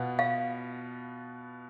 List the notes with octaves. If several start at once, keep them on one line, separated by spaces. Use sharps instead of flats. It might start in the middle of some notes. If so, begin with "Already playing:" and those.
Already playing: B2 B3 F4
F5